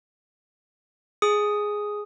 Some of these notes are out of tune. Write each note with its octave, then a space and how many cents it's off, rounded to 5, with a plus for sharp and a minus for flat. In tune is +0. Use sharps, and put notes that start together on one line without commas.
G#4 +0 D#6 +0